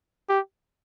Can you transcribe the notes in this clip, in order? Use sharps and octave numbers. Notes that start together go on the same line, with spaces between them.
G4